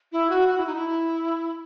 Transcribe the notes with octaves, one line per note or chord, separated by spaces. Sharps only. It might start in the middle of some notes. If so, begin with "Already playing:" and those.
E4
F#4
F#4
E4
D#4
E4